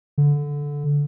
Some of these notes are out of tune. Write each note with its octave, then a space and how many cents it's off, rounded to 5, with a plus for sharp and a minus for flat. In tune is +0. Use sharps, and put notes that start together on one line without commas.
D3 -15